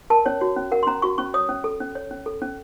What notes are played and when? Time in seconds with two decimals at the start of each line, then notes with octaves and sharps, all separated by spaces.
0.10 A#4 A5
0.26 C#4 C#5
0.41 F#4 C#5
0.56 C#4
0.72 A#4 F#5
0.83 C6
0.87 C#4 A#5
1.02 F#4 C#6
1.18 C#4 C#6
1.34 C#5 D#6
1.49 C#4
1.64 A4
1.80 C#4
1.95 C#5
2.11 C#4
2.26 A4
2.42 C#4